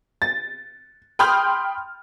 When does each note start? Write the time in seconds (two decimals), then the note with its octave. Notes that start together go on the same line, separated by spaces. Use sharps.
0.22 A6
1.19 G5 B5 C6 D#6 F6 G6